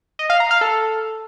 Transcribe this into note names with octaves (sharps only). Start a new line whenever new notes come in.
D#5
F5
A#5
F5
A4